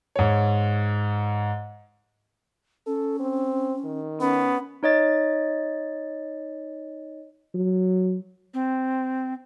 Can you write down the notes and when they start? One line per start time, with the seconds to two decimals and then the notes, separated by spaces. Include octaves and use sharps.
0.16 G#2 C#5
2.87 C#4 A4
3.20 C4
3.85 D#3
4.21 B3 C#4
4.83 D#4 C#5 D#5 A6
7.55 F#3
8.54 C4